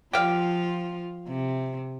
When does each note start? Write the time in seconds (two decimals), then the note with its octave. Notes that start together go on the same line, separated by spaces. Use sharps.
0.13 F3 F4 G4 F5
1.27 C3